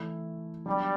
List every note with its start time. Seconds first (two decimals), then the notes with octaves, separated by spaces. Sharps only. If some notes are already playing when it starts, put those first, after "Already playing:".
Already playing: E3 A3 E4
0.66 F#3 G3 B3 D4 F#4